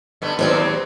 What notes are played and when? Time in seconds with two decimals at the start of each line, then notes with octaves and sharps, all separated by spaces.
0.22 G2 D3 B3
0.39 D#2 F#3 B3 C4 C5 D5